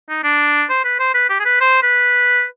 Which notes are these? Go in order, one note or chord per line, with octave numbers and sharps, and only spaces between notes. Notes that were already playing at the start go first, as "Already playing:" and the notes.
D#4
D4
C5
B4
C5
B4
G4
G#4
B4
C5
B4